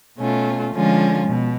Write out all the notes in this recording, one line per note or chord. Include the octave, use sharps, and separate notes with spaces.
B2 A3 C#4 F4
D3 F3 G#3 C#4 F4
B2